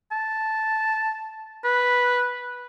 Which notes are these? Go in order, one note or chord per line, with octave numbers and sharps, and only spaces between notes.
A5
B4